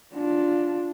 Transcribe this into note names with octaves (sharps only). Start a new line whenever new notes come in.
D4 F4